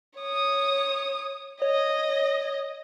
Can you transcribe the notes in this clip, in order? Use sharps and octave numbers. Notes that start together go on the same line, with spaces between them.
C#5 D#6
C#5 D#5